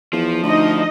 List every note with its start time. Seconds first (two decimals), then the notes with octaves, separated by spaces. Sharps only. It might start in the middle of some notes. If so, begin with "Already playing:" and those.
0.13 E2 F3
0.43 D2 D#4 D#5